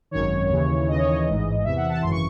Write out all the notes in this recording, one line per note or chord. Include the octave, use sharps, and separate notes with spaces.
G#1 F#2 D#3 C#5
D#2 C#3 E3
D#2 C#3 E3 D#5
C#5
D#5
A1 G#2 E3
E2 C3 E3 E5
F#5
A5
G#1 F#2 C#3 E3 C6
C#6